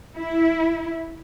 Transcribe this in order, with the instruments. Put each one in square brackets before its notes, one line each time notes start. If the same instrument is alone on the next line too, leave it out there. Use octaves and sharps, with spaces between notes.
[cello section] E4